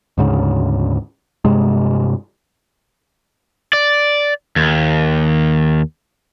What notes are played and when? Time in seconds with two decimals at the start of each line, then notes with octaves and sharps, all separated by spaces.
0.18 D2 G#2 C#3
1.45 G2 C3 G#3
3.73 D5
4.56 D#2